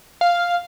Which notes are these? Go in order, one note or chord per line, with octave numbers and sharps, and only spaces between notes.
F5